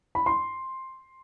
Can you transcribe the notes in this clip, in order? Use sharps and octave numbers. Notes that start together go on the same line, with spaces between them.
B5
C6